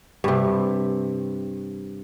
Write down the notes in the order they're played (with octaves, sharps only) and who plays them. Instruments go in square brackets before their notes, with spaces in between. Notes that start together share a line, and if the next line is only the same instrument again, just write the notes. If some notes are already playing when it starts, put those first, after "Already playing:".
[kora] G2 C3